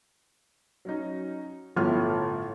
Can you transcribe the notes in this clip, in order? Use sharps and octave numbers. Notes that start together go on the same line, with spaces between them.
F#3 C#4 D#4
G1 A2 F3 F6